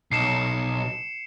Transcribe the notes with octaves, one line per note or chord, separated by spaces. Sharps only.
B1 C7 C#7 E7